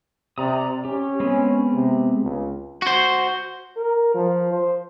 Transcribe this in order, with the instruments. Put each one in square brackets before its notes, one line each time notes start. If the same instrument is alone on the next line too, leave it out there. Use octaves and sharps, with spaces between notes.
[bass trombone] C3 [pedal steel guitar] D5 A#5 D#6
[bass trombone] C#4 [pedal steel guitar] G4
[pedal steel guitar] G#3 B3 C4
[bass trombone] C3
C#2
[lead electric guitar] F#4 C5
[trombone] A#4
F3
C5